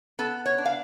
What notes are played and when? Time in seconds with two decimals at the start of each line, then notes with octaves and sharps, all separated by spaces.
0.19 B3 A4
0.46 C#5
0.58 D4
0.65 F5